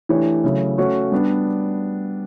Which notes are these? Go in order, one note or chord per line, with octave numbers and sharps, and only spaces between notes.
E3 A3 D4 G4 C#5
C#3 F#3 A3 E4
A3 C#4 F#4 C#5
G3 B3 D4